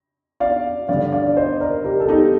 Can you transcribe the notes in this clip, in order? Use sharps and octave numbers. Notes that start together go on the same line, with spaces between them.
D5 F5
G2 D3 D5 F5
D5 F5
D5
C5 D#5
A#4 D5
G4 A#4
A4
D#4 G4